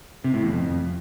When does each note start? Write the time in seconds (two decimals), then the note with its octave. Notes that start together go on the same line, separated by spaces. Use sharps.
0.24 C3
0.34 A2
0.44 E2
0.53 F2